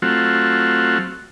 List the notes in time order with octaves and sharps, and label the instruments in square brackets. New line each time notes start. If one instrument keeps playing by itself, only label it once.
[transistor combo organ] F#3 A3 C4 F4 F#4